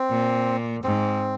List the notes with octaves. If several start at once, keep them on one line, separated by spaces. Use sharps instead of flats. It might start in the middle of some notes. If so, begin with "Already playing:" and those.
Already playing: C4
A#2
G#2 C4